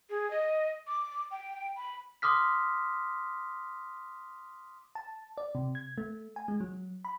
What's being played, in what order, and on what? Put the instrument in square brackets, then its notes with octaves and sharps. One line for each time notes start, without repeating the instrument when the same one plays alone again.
[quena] G#4
D#5
D6
G5
B5
[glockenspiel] C6 D6 D#6 F6 B6
[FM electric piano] A5
D5
C3
G#6
A3
G#5
G#3
F#3
B5